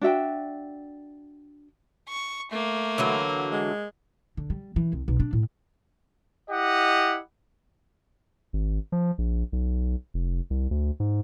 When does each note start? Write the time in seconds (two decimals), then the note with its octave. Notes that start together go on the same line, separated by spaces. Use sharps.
0.01 D4 F#4 E5 G5
2.09 C#6
2.52 A3 A#3
2.98 D3 E3 F#3
3.52 G#3
4.37 D3
4.50 G3
4.76 E3
4.93 C2
5.08 B1
5.20 D4
5.33 A2
6.51 E4 G4 D#5 F#5
8.53 G#1
8.92 F3
9.18 A#1
9.52 B1
10.14 F1
10.50 C2
10.71 D2
11.00 G#2